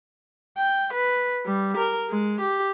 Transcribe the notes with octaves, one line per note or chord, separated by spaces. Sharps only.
G5
B4
G3
A#4
G#3
G4